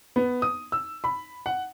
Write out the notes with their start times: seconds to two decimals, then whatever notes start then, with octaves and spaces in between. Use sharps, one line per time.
0.16 B3
0.42 D#6
0.72 E6
1.04 B5
1.46 F#5